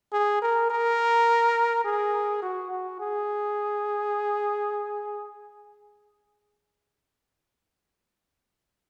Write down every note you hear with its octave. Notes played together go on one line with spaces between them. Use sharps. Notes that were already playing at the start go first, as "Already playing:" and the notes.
G#4
A#4
A#4
G#4
F#4
F#4
G#4